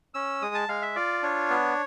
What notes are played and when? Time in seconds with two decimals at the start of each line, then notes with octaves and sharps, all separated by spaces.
0.14 C#4 E6
0.42 G#3 D#6
0.55 A5
0.68 G#3 F5
0.82 E5
0.96 F4 D5
1.23 D4 C#5
1.50 B3